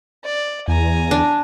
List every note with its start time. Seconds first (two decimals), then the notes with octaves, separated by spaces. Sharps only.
0.24 D5
0.68 E2 G#5 A#5
1.11 D4